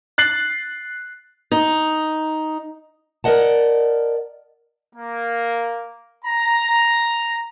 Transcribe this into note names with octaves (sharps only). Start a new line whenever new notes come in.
F#6 A6 C7 F#7
D#4
A#4 D5 D#5 F#5 A5
A#3
A#5